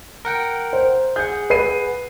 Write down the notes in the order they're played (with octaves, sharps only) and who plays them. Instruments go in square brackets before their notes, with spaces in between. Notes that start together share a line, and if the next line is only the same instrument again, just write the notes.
[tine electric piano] A#4 F#5 G5
[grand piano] C5
[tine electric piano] G#4 F#5 [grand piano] G6
[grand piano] B4 C7 D#7